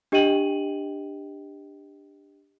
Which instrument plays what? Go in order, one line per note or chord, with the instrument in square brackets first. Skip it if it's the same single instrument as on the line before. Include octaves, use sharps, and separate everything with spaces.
[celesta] D4 G4 D#5 G5 D#7 F#7